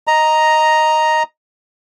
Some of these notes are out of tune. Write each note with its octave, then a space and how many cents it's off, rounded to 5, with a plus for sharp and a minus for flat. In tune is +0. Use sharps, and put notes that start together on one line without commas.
D#5 +0 A#5 +0